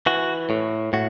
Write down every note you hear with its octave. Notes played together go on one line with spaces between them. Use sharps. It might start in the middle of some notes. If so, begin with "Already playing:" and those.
E3 F#4
A2
A2 F#4